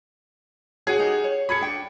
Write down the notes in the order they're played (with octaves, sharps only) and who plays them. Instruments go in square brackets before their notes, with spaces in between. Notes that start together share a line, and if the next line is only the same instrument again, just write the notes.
[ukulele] F#4 C#5 G#5 [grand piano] G#4 F#5
[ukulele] D#4 G4 A#4
C#5
[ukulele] G#4 A4 [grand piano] B5 G#6 C#7
[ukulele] D4 G5